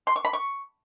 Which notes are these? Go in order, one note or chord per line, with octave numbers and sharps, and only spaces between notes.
C6
C#6
B5
C#6